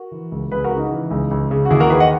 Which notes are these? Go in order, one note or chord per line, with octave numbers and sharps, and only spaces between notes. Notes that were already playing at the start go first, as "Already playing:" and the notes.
Already playing: F#4 A#4
E3
C#2
C#2 G#4 B4
F#4 A#4
C#3
D#4
E3
C#2
C#2
C#3
F#4
D#2 E4 G#4
F#4 A#4
D#3 G#4 B4
D#5 F#5